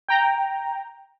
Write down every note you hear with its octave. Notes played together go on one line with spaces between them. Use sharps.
G5 A#5